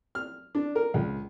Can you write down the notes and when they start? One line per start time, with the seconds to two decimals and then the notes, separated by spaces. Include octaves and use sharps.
0.15 F6
0.55 D4
0.75 A#4
0.94 C#2